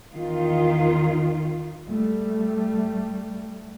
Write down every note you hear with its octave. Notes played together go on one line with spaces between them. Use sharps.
E2 D#3 F4
G3 A3